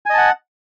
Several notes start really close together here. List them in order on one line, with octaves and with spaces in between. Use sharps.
G#5 D#5 A5 F#5